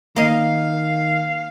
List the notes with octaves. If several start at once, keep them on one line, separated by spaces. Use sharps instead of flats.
D#3 A#3 D#5 F5